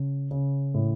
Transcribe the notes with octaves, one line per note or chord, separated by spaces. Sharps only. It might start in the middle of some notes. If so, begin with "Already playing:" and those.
Already playing: C#3
C#3
A2